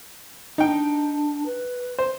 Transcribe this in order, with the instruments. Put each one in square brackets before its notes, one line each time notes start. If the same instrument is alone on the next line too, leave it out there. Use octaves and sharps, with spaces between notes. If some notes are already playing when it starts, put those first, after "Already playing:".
[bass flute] D4 [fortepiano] D#4 G5
[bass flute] B4
[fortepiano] C5